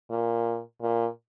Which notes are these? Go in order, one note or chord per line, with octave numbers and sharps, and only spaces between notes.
A#2
A#2